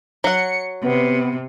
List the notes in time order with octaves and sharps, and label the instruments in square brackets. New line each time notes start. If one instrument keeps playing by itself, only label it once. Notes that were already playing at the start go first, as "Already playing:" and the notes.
[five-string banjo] F#3 F#5 [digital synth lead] C#7
[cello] C3 [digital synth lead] B3